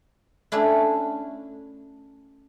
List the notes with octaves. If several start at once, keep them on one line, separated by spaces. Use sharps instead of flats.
A3 C#4 D4 E4